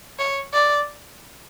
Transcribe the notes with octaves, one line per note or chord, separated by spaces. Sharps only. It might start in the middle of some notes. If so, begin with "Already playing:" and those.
C#5
D5